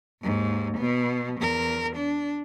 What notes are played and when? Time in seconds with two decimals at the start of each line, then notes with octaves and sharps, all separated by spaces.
0.22 D#2 G#2
0.77 B2 B3
1.40 E2 A#4
1.96 D4